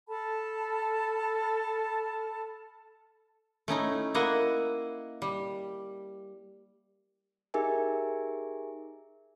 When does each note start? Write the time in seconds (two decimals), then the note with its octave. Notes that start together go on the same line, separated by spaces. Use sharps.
0.09 A4 A5 B5 F6
3.68 A3 C#4 D#4 E4
4.14 A#3 E4 D#5 F#5
5.22 G3
7.54 D#4 G4 G#4 A#4 E5 G#5